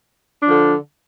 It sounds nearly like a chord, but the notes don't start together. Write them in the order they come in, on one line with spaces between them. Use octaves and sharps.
D4 F3 D3